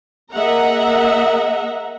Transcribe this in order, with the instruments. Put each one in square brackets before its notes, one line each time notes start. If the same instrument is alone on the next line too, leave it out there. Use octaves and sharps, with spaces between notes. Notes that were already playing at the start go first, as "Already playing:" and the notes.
[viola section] A#3 G#4 D#5 E5 F#5 A#5